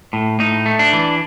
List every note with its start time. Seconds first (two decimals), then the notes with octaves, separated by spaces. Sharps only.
0.13 A2
0.40 A2 D#4
0.66 A3
0.79 D4
0.93 E3